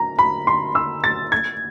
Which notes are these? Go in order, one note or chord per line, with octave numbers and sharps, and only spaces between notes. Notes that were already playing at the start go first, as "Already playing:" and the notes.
Already playing: A#5
B5
C6
E6
A6
G#6